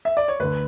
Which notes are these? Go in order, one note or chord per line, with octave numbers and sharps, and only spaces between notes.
E5
D5
C#5
D2 D3 B4